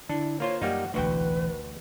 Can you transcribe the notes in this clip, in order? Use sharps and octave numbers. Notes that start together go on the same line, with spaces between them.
D3 D4 E4
A#3 F4 C5 C#5
F#2 G3 A#3 D#4 F#5
E1 A1 D2 E3 F#4 B4 G5